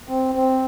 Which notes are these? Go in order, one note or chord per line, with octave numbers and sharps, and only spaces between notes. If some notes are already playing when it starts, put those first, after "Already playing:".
C4
C4